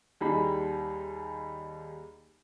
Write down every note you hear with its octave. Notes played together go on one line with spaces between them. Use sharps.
D#2 G3 D#4 G#4 B5